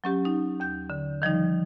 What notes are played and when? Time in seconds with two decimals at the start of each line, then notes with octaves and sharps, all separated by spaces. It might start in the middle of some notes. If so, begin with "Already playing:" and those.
0.04 F#3 C#4 G4
0.25 D#4
0.60 D#2 G6
0.90 D3
1.22 D#3 F3 G3 D#4